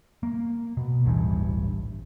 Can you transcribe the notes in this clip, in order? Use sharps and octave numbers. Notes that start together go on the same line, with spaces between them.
A#3
B2
D1 A1 G2 E3